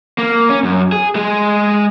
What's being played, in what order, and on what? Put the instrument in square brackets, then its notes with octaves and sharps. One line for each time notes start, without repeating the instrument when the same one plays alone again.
[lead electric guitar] A#3
C#4
F#2
G#4
G#3 G#4